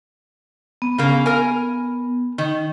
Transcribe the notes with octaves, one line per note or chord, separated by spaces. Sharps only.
B3
C#3 A#3
A#4 G#5
D#3